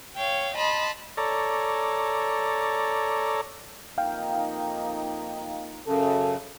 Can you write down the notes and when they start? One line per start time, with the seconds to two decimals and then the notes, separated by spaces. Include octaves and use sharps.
0.16 C#5 F5 G5
0.57 D#5 A5 B5 C6
1.17 A4 C#5 D5 A#5
3.98 F2 A#3 D#4 F5 G5
5.87 F#2 C#3 A4